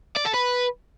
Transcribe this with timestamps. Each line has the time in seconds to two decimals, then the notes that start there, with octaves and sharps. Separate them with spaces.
0.17 D5
0.26 A4
0.34 B4